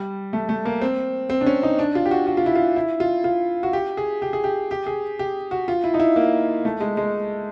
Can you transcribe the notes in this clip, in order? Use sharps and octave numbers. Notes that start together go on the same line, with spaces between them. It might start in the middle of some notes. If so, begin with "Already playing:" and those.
Already playing: G3
A3
A3
A#3
C4
C4
D4
C#4
D#4
D4
F4
G4
F#4
F#4
F4
E4
F4
E4
F4
F4
F#4
G4
G#4
G4
G#4
G4
G4
G#4
G4
F#4
F4
E4
D#4
E4
A#3
A3
G#3
G#3